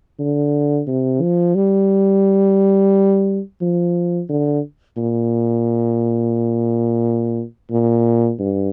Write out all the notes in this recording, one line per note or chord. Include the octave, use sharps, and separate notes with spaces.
D3
C3
F3
G3
F3
D3
A#2
A#2
G2